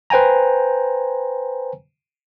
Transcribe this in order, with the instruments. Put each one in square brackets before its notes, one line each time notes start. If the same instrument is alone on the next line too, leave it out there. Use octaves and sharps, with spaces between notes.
[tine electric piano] B4 C5 G5 G#5 A#5